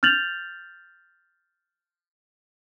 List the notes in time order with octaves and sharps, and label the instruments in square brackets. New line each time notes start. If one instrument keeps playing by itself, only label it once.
[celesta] F6 G6 A6 F7 F#7